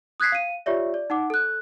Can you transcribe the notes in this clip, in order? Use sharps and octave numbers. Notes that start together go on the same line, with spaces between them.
D#6 F#6 G#6 B6 C7
F5 D#7
F4 G4 C#5 D5 E5
D5
D#4 F#5 D6
A4 F#6